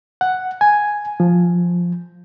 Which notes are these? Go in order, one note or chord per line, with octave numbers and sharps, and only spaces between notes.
F#5
G#5
F3